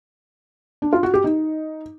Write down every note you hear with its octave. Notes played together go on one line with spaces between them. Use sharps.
D4
F4
F#4
G4
D#4